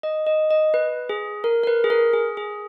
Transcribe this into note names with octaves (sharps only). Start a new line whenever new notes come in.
D#5
D#5
D#5
B4
G#4
A#4
A#4
B4
G#4
A#4
G#4
G#4